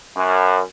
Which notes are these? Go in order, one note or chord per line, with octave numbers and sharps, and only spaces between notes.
F#2